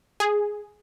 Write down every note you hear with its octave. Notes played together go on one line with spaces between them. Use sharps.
G#4